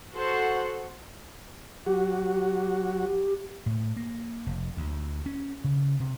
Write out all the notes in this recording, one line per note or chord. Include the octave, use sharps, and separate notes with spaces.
F#4 A4 C5 F#5
F#3 F#4 G4
A2
A#3
F1
D2
C#4
C#3
C3